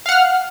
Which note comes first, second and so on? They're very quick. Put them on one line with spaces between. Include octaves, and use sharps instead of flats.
F5 F#5 F6